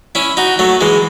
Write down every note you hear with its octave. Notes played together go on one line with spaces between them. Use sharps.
C#4 E4
D#4 F#4
F#3 A3
E3 G#3